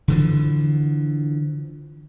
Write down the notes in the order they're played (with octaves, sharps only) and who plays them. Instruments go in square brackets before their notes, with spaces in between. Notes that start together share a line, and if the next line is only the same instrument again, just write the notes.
[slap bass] D3 E3 F3